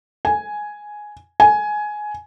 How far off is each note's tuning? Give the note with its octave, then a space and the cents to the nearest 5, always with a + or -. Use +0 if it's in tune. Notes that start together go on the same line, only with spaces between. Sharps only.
G#5 +5
G#5 +15